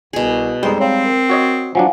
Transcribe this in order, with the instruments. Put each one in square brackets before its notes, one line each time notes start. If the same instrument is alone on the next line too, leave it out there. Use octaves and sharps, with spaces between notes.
[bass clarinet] C2 [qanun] B2 G#4
[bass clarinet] F2 [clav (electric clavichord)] G3 G#3 D#4 [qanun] C5
[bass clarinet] C4 [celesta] C#5 F5 G5
[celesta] A#4
[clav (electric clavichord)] F#4 C#5 D#5
[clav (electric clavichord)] F3 F#3 D4 [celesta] F5 F#5 G#5